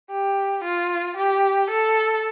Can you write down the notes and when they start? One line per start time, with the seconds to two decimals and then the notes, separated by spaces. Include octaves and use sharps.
0.11 G4
0.64 F4
1.18 G4
1.70 A4